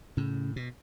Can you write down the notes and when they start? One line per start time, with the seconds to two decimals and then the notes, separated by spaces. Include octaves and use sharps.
0.17 A2 C#3
0.56 B2